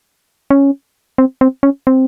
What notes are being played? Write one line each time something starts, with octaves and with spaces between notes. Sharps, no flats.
C#4
C4
C4
C#4
C4